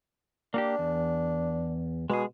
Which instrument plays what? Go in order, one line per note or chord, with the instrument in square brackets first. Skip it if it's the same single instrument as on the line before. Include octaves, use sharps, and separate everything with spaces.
[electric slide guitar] A#3 F#4 G4 [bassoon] D4
[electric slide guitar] E2
[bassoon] B2 [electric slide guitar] G#3 G#4